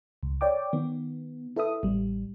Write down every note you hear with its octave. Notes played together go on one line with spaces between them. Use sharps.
C#2
C#5 D5 G5 D6
D#3 B3
E4 A4 B4 E5 D#6
A1 G3